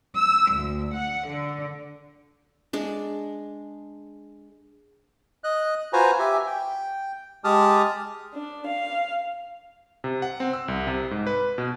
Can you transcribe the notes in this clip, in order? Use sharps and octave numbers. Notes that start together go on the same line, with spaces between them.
E6
D2
F#5
D3
G#3 D4
D#5 F#6
F4 F#4 B4 C5 G#5 A#5
G4 E5 G#5
G5
G#3 G4 A5 D#6 F6
D4
F5
C3
F#5
C4
E6
C2
C3
G#2
B4
B2